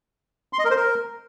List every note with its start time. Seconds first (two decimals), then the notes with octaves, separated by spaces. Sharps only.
0.53 C6
0.59 D#5
0.65 A#4
0.71 C5
0.76 A#4